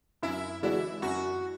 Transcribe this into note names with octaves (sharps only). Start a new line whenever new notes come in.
F#2 E4
E3 G#3 D4 E4 F#4
F#2 F#4